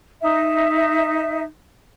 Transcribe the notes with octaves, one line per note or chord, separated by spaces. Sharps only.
D#4 E5